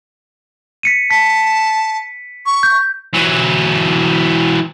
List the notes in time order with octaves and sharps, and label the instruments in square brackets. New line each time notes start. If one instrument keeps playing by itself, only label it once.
[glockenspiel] B6 C#7 D#7
[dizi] A5 [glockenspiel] B6
[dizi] C#6
[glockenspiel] G6
[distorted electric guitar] E3 F#3